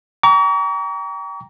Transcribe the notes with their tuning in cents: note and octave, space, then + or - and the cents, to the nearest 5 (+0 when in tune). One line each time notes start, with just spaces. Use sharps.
G5 +0 A#5 +0 C#6 +45